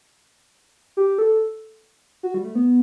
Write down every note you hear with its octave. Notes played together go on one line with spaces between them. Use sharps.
G4
A4
F#4
G3
A3
B3